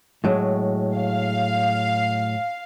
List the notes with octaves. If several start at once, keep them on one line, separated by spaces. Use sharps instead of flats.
A2 F#3 G#3
F5